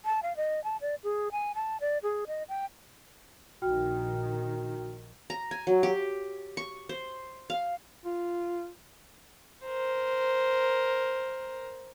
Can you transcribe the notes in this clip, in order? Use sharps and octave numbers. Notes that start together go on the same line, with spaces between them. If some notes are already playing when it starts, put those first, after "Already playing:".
A5
F5
D#5
A5
D5
G#4
G#5
A5
D5
G#4
D#5
G5
A#1 D#3 F#4 G5 F6
A#5
G#5
F#3
G4
C#6
C5
F5
F4
A#4 C5